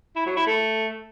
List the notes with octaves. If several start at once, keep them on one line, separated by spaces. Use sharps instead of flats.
E4
F#3
E4
A3